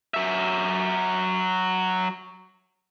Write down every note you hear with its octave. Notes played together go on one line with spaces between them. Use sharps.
F#3 E5